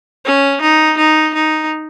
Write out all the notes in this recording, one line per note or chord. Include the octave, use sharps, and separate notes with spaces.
C#4
D#4
D#4
D#4